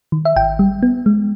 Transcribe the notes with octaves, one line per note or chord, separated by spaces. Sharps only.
D#3
E5
G#1 G5
G3
B3
G#3